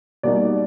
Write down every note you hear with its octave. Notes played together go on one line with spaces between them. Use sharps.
B2 G3 A#3 D#4 D5